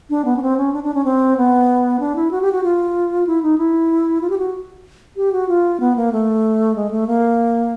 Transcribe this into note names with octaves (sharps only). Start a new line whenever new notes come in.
D4
B3
C#4
C4
C#4
D4
D4
C#4
C4
B3
D4
E4
F#4
G4
F#4
F4
E4
D#4
E4
F4
G4
F#4
G4
F#4
F4
B3
A#3
A3
G#3
A3
A#3